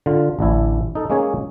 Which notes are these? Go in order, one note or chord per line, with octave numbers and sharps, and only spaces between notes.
D3 F4
A1 D2 D4 E4
D#4 A4
G#3 A#3 C#4 G#4 C#5